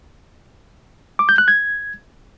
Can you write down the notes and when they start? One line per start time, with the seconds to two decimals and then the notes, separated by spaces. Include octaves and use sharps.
1.19 D6
1.29 G6
1.38 F#6
1.48 G#6